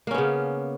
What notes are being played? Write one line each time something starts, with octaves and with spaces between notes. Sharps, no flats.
C#3 A#3 B3 C#4